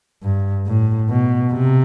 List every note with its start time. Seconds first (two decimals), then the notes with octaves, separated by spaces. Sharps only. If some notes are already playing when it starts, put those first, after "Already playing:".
0.23 G2
0.67 A2
1.10 B2
1.53 C3